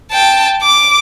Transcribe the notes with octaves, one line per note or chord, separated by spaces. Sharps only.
G5 A5
D6